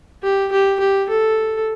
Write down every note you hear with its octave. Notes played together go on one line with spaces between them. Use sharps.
G4
G4
G4
A4